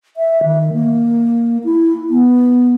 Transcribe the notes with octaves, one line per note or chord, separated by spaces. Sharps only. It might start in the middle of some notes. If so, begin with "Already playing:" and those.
E5
D#3
A#3
E4
B3